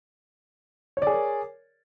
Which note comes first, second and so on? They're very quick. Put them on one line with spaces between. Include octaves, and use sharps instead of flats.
C#5 D5 G#4 A#4